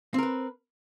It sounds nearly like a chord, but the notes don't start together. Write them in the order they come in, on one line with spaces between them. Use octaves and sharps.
C4 A#4 B4